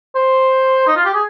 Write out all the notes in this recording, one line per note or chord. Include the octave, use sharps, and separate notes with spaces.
C5
D#4
F4
G4
G#4